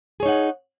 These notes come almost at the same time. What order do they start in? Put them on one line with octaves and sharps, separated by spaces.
G#4 C#5 D#4 F#5